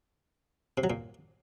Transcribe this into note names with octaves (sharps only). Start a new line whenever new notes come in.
C3
F#3
A#2